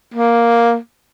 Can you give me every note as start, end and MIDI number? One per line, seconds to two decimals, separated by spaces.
0.14 0.77 58